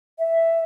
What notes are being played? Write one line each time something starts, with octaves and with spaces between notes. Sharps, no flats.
E5